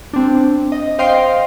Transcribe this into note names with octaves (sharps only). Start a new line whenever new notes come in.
C4 D4
D#5
C5 D#5 F5 G5 C6 C7